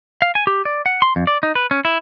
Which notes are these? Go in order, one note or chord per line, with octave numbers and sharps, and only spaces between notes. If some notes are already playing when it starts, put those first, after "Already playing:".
F5
G#5
G4
D5
F#5
C6
F2
D5
D#4
B4
C#4
E4